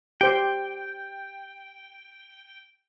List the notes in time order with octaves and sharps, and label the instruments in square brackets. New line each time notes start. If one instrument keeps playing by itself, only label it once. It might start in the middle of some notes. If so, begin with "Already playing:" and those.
[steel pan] G4 C5 [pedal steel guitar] G5